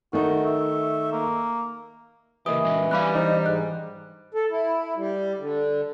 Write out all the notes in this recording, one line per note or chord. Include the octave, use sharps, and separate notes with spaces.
D#3 A3 D#4 F#4
E5
A#3
C#3 E3 A#3 G4 A#4 D#5 D#6
G#3 C#4 F#4
G3 C4 D4 F5 G#5 B5 F#6
E3 D4 D#4 C5 D#5
G#2 F#6
A4
E4
G3
D3